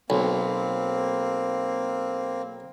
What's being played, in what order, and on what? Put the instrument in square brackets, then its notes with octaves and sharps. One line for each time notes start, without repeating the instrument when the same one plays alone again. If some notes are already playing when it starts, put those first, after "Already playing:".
[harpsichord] B1 [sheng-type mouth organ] A#3 C4